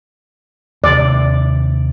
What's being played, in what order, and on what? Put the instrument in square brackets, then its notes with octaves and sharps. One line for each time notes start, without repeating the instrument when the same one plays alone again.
[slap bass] D#2 C3 [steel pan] D5